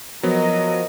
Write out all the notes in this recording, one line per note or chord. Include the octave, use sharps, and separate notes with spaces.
F3 F#3 B3 A#4 D#5